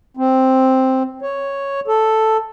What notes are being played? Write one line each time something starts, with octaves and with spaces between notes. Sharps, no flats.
C4
C#5
A4